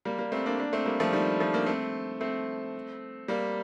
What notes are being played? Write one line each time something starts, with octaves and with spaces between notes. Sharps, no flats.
G3 A#3
G3 A#3
A3 C4
A#3 D4
A#3 D4
A3 C4
G3 A#3
F3 A3
D#3 G3
F3 A3
A#3 D4
A3 C4
A3 C4
G3 A#3